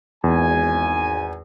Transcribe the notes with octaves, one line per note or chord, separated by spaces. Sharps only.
G#1 E2 G#5